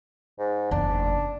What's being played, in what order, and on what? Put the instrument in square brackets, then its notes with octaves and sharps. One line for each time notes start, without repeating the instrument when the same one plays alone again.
[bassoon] G#2
[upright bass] F#1 E2 [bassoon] D4